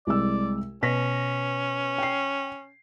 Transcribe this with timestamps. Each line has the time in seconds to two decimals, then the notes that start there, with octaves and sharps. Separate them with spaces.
0.07 C2 G#3 D5 E6
0.83 B2 C#4 A#6 B6
1.98 G5 C7